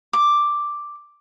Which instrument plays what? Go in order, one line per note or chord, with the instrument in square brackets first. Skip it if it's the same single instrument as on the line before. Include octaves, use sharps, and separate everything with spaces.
[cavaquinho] D6